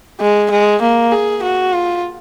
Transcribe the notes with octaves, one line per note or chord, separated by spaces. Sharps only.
G#3
G#3
A#3
G#4
F#4
F4